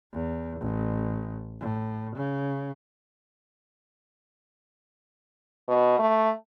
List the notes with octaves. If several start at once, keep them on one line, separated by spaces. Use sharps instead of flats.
E2
A1
A2
C#3
B2
A3